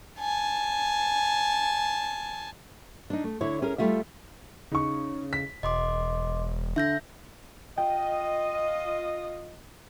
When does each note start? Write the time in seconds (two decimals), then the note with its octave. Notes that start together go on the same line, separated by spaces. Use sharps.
0.19 G#5 A5
3.10 D4 D#4
3.24 A3
3.41 D3 E4 C#5
3.62 C#4 G#4 A#4
3.78 G3 A3 F4 E5
4.72 C#3 D#4 C#6
5.33 B6
5.63 E1 D#5 C6 D6
6.76 D3 E5 G6 A#6
7.77 F4 D#5 G5